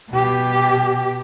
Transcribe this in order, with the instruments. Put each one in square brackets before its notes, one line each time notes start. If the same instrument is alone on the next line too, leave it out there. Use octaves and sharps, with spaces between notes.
[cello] B2 G4